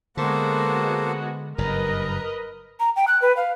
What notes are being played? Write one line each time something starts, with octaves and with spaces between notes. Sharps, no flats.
D3 G#3 A#3 B3 F#4 A4 C5
F#1 G2 A#4 B4 D#5 A#5
A#5
G5
F#6
B4
F5